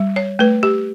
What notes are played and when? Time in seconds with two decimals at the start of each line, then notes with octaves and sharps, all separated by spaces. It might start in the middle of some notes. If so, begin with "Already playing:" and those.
Already playing: G3
0.16 C#5
0.39 A3 B4
0.63 G4